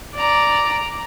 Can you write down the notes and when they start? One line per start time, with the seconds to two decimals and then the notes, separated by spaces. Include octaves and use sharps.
0.15 D5 A#5